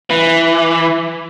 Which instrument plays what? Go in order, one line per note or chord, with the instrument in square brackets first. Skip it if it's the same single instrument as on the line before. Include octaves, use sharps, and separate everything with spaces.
[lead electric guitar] E3